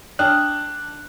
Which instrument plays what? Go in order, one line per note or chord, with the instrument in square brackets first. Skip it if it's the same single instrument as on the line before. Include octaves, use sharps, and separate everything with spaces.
[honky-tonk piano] D4 [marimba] G5 D#6 F6 [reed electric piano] F#6